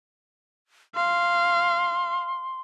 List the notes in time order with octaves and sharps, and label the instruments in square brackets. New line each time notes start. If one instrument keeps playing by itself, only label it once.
[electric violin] F5 [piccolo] C6